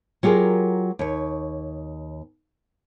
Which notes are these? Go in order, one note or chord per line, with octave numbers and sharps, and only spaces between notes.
F#3 F4 G4 G#4 A#4
D#2 C#5